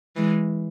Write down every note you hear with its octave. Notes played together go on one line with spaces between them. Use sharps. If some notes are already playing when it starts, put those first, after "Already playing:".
E3 G#3